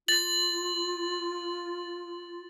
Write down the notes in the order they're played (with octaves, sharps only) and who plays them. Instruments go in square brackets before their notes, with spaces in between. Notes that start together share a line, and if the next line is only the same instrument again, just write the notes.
[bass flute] F4 [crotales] A6 F#7